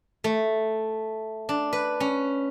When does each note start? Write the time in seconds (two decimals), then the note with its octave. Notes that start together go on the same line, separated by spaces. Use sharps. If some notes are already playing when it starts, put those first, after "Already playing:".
0.24 A3
1.49 D4
1.73 B4
2.00 C#4